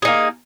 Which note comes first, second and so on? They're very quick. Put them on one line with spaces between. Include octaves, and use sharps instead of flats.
G#4 D#4 A#3